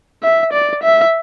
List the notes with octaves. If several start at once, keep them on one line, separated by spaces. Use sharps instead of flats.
E5
D5
E5